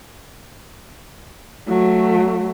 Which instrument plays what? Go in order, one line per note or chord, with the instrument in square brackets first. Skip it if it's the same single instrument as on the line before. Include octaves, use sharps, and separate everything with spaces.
[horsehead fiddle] F#3 A3